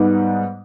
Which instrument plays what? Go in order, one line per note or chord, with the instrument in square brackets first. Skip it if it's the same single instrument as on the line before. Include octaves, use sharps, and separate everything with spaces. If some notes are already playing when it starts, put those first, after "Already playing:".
Already playing: [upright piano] G#2 G3 B3 D#4